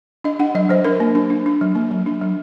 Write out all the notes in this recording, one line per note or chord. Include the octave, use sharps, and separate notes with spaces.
D4 D#5
D4 F#5
F#3 D#5
F#3 C5
D4 A#4
A#3
D4
D4
D4
F#3
A#3
F#3
D4
F#3